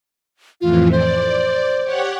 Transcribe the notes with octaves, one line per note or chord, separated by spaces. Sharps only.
F2 A2 E3 F4
C5 D5
G4 C#5 F#5